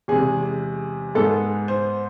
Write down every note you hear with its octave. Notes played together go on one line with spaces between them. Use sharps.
E2 C3 G#3 G#4
G#2 G#3 B3 A4
C5